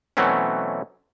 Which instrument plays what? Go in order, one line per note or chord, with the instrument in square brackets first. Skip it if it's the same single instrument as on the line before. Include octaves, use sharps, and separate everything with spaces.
[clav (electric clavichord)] B2 E3 F#3 A3 C4 C#4